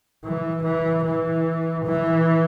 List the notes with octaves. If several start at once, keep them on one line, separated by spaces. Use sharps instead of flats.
E3
E3
E3
E3